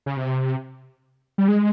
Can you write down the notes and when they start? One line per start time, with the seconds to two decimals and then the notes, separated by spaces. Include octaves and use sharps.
0.06 C#3
0.17 C3
1.38 G3
1.48 G#3